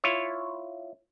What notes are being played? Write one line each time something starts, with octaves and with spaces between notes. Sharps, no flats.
E4 F4 C#5